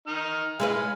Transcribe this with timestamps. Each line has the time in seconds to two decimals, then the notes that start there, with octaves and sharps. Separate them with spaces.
0.07 D#4 F6
0.60 G#3 E4 B4 F5 G#5